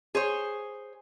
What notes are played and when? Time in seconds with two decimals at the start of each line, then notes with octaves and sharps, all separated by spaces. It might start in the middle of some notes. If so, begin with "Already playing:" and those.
0.15 G#4 C5 C#5